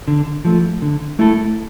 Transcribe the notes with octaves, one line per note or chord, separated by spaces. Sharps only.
D3
F3 A3
D3
A3 E4 A4